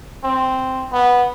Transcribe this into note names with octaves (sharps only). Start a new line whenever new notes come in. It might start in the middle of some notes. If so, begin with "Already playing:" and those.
C4
B3